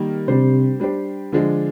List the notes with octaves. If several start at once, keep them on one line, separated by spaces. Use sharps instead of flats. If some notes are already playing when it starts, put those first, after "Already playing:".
Already playing: D#3 G3 A#3
C3 G3 D4 G4 C5
G3 D4 G4 C5
D3 F3 G#3 D4